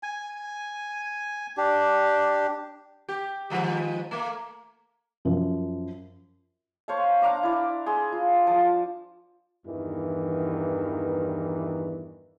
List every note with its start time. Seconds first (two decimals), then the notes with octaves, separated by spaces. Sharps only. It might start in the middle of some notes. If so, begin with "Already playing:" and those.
0.03 G#5
1.57 D4 G4
3.09 G4
3.50 D#3 F3 G#3
4.11 A3 A#3
5.25 F#2 F3
6.88 C5 C#5 F5 A5
7.22 D4 F5 A#5 D6
7.43 E4 D5
7.86 G#4 C6
8.12 F4
8.47 F3 A5
9.66 E2 G2 D#3 E3